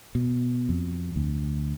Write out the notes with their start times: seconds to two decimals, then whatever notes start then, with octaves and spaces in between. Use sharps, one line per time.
0.15 B2
0.69 F2
1.16 D2